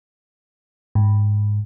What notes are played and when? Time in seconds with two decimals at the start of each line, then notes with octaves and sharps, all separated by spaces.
0.95 G#2